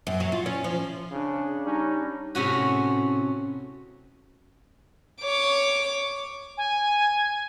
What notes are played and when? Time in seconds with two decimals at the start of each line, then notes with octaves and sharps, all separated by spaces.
0.07 F#2
0.20 F#3
0.32 F4
0.46 C#4
0.64 F3
1.11 C#3 D4
1.65 G3 C#4 D#4
2.35 A2 C3 C#4 F#4
5.22 C#5 D6
6.58 G#5